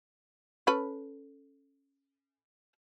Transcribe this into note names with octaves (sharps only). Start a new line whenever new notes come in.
C#4 A4 B4